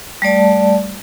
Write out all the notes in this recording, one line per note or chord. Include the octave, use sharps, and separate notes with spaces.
G3 A3 D5 A5